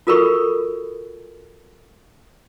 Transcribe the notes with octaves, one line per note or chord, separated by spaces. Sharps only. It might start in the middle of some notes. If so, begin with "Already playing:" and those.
F4 F#4 A4 A#4 B5 C#6